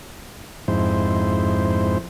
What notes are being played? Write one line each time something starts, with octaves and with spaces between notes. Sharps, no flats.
F2 G#2 E4 C5